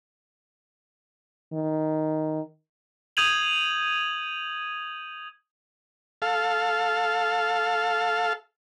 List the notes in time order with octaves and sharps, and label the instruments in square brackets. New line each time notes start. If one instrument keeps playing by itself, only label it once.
[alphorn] D#3
[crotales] D#6 G6 G#6 D#7 F7 F#7
[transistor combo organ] A4 F5